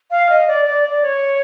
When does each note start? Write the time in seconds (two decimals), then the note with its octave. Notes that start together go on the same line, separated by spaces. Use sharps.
0.11 F5
0.29 D#5
0.48 D5
0.65 D5
0.84 D5
1.03 C#5